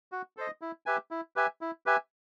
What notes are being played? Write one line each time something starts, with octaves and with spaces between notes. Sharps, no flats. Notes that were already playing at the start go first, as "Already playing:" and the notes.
F#4
A4 C5 D#5
E4
G4 B4 E5 G#5
E4
G4 B4 E5 G#5
E4
G4 B4 E5 G#5